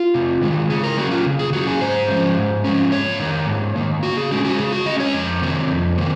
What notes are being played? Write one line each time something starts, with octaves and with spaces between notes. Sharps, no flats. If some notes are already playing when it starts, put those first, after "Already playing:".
Already playing: F4
C3
D#3 G#3
C#3 G#4
A#4
F#3 A#3 C#4 F#4
F4
C#3
G#4
F#3 A#3 C#4 F#4
G#4
G#2 C5
F3 G#3 C#4
G#2
F3 G#3 C#4
G#2 C#5
D#3 A#3
G#2
D#3 A#3
C#3 F#4
G#4
G#3 C#4 F#4
F#4
C#3 G#4
F#4
G#3 C#4 D#5
C#5
F2
C3 D#3 A#3
F2
C3 D#3 A#3